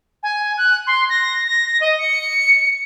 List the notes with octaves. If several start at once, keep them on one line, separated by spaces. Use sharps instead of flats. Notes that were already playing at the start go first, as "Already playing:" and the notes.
G#5
F#6
C6
A#6
A#6
D#5
C#7